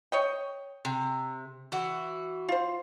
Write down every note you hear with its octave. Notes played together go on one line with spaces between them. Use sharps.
C#5 D#5 G5
C3
E3 F#4
F4 C5